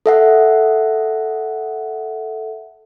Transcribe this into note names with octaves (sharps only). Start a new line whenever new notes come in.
A4 E5 F#5